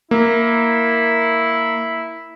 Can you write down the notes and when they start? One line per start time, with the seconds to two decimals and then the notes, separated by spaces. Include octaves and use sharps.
0.11 A#3 E4